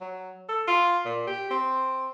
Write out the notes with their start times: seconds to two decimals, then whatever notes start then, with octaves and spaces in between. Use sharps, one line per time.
0.01 F#3
0.49 A4
0.68 F4
1.05 A#2
1.27 G4
1.51 C4